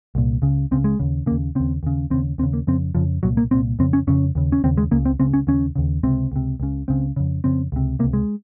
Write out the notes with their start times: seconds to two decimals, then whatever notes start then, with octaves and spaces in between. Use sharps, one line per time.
0.15 C2 A#2
0.42 C#2 C#3
0.71 C#2 C#3 C4
0.84 G#3
0.99 D#2 C#3
1.26 C#3 A#3
1.31 D#2
1.55 D#2 C#3 C4
1.83 D#2 C#3
2.10 D#2 C#3 C4
2.38 D#2 C4
2.43 C#3
2.53 A#3
2.67 F2 C#3 C4
2.95 F2 C#3 F3
3.23 C2 A#2 F#3
3.37 A#3
3.51 C2 A#2 C4
3.79 F2 C#3 C4
3.93 C#4
4.07 F2 C#3 C#4
4.35 D#2 C#3
4.52 C#4
4.64 D#2 C#3 C4
4.78 G#3
4.91 C#2 C#3 A#3
5.06 C4
5.20 C#2 C#3 C4
5.34 C#4
5.47 D#2 C#3 C#4
5.75 D#2 C#3
6.03 C#2 C3 C4
6.32 C#2 C3
6.60 C#2 C#3
6.88 C#2 C#3 C4
7.16 F2 C#3
7.44 F2 C#3 C4
7.72 C#2 C3
7.99 C3 A#3
8.04 C#2
8.13 G#3